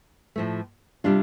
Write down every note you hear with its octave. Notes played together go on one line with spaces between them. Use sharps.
A2 F3 A3
C3 G3 D4 F4